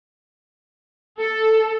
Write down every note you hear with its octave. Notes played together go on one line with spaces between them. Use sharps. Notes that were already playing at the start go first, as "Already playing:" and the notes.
A4